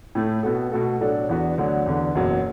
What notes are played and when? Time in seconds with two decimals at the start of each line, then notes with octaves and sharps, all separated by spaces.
0.15 A2 A3 E4
0.43 B2 B3 F#4 A4
0.72 B2 A3 F#4 A4
1.01 A2 F#3 D4 A4
1.29 E2 E3 B3 D4 F#4
1.58 D2 D3 F#3 D4
1.86 E2 D3 B3
2.15 F#1 E2 B2 F#3